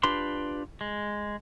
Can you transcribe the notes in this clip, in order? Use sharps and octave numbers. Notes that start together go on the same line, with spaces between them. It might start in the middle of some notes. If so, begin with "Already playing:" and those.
D4 F4 G4 B4 C6
G#3